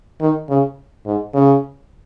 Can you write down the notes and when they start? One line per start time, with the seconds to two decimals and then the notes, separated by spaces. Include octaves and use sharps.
0.21 D#3
0.50 C#3
1.06 G#2
1.34 C#3